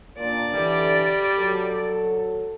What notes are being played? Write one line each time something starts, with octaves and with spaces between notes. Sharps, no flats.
A#2 D4 D5
D3 E3 G3
F#3 A4